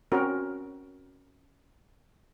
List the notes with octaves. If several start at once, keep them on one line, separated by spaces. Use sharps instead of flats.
C4 C#4 F#4 A#4